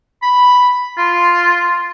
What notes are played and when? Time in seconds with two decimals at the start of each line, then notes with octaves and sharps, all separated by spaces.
0.23 B5
0.98 F4